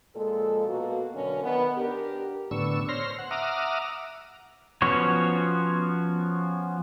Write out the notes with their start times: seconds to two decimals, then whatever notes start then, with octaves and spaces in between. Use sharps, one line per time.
0.16 A#2 F3 G#3 A4
0.67 B2 A#3 F#4 A4
1.14 F#2 B2 D3 C#4 D4 A#4
1.44 D#3 B3
1.77 D4 G4 A#4
2.51 A2 D3 B3 D4 C#6 E6
2.89 C5 C#5 C6 F6 A#6
3.19 F#5
3.31 E5 F#5 A#5 D6 D#6 F6
4.82 F3 B3 C#4 F#4 C#5